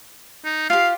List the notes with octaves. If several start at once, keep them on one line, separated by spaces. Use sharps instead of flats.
D#4
F4 G4 F5